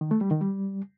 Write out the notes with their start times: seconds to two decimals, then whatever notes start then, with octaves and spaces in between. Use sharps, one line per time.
0.01 D#3
0.11 A3
0.21 G3
0.31 D#3
0.41 G3